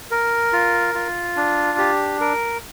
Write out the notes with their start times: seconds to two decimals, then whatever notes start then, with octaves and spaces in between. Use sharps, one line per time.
0.11 A#4
0.53 F4
0.95 F4
1.36 D4
1.78 G4
2.20 A#4